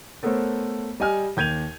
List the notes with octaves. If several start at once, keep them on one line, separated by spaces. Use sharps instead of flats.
A3 B3 A4 A#4 C5 C#5
G3 D#5 G#5 F6
D#2 G6 G#6 D#7 F7